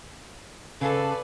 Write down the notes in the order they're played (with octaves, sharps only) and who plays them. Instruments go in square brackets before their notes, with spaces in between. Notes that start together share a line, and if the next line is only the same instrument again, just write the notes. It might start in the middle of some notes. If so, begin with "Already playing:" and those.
[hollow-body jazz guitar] C#3 [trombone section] A4 [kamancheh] B4 D5 [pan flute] F5